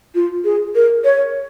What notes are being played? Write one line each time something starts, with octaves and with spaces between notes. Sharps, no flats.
F4
G#4
A#4
C#5